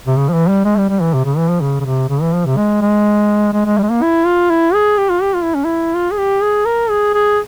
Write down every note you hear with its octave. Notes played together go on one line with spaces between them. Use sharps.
C3
C#3
F3
E3
G3
G#3
G3
G3
E3
C3
C#3
E3
F3
C#3
C#3
C3
C#3
E3
F3
C3
G#3
G#3
G#3
G#3
G3
G#3
A#3
E4
F4
E4
G#4
G4
F4
G4
F4
E4
C#4
E4
F4
G#4
G4
G#4
A#4
G#4
G#4